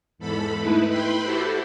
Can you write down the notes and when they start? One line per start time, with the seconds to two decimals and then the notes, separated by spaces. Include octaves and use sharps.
0.18 E2 G#2 A4 B5
0.58 A3 D#4 E4 B4
0.89 B4 G5 B5 C6
1.22 E4 F#4 G4 A4 C5